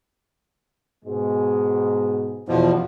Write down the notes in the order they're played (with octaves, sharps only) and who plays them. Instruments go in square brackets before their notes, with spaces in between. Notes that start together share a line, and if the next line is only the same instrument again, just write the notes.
[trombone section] G#2 B2 G#3
[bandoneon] E2 B2 F3